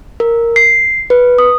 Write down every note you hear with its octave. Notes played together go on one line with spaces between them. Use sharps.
A#4
C7
B4
D#6